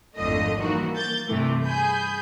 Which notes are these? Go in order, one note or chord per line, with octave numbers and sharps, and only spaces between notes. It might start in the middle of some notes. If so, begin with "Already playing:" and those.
G#1 F2 A2 D3 A3 D#5
E3 F3 G3 A#3 D#4 F#4
A#3 G6 A6
G2 C3 E3 A3
G#4 G#5 B5 G6